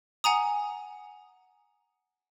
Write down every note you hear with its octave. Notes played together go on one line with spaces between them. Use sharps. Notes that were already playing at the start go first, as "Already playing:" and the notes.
F#5 G#5 A#5 D#6